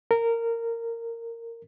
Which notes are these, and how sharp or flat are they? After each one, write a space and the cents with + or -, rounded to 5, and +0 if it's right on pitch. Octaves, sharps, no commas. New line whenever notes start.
A#4 -15